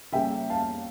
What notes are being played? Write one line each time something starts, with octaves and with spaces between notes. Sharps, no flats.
C#3 G3 A#3 C#4 E5 G5
F5 A5